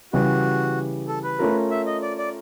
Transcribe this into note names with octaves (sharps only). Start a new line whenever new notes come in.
C#3 E3 G3 F#4
A4
B4
A3 C#4 F4 A#4
E5
D#5
D5
D5